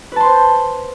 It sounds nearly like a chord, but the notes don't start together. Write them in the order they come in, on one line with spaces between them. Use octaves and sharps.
B4 A5 C6 C5